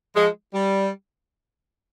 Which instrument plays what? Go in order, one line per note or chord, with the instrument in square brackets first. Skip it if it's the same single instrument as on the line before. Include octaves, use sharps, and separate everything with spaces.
[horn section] F3 G#3
G3